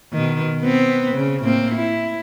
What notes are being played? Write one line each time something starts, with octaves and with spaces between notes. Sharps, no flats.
B2 D#3
B3 C4
C#3
A2 A#3 C4
E4